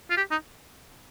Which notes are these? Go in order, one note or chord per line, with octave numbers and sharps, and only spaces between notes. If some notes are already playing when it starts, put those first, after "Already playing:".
F4
G4
D#4